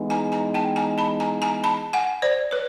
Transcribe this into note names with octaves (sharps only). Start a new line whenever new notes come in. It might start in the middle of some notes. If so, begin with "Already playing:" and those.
Already playing: E3 G#3 B3 D#4
G#5 A#5
G#5 A#5
G5 A5
G#5 A#5
A5 B5
G#5 A#5
G#5 A#5
A5 B5
F#5 G#5
C5 D5
B4 C#5